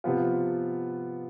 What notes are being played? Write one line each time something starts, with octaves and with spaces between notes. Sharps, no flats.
C3 F3 B3 F4